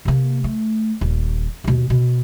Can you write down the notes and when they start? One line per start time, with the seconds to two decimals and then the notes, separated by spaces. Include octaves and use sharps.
0.05 C3 A#3
0.44 A3
1.01 D#1
1.64 D#2 B2
1.90 B2